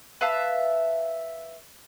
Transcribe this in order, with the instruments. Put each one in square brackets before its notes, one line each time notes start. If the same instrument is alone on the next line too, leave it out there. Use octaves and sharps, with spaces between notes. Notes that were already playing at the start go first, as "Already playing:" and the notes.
[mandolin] B4 E5 F5 A5